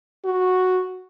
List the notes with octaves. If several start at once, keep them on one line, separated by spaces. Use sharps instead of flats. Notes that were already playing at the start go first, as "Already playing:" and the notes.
F#4